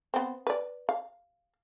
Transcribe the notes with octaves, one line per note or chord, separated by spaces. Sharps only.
B3 C4
B4 D5
F5